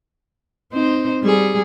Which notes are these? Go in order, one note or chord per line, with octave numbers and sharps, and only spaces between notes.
C4 D#4 C5
G3 G#4